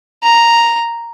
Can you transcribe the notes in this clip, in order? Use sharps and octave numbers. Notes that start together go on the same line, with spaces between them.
A#5